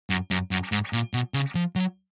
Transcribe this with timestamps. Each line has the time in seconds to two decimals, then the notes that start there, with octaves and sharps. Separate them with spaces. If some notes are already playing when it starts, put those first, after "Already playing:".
0.10 F#2
0.31 F#2
0.51 F#2
0.72 G#2
0.93 A#2
1.14 B2
1.34 C#3
1.55 F3
1.76 F#3